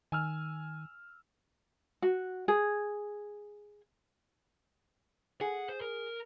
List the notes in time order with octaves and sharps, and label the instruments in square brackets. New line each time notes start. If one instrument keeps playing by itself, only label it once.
[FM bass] D#3 [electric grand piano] G#5 E6 F6
[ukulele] F#4
G#4
[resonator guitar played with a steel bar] G#4 [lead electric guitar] F#5
[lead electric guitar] C5
A#4